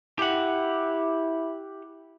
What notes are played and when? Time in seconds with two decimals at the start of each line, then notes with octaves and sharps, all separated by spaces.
0.19 E4 G4 F#5